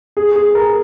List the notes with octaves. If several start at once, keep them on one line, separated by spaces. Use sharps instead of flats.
G#4
G#4
A#4